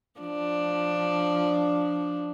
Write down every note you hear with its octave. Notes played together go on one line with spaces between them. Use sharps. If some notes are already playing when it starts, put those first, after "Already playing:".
F3 D4